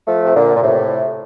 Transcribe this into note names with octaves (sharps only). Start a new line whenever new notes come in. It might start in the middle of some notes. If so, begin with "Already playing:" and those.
F3 A3
C3
A#2 D3
A#2
A2 C3